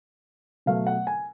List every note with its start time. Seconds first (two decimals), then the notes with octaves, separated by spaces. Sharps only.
0.66 B2 F#3 A3 F5
0.87 F#5
1.07 G#5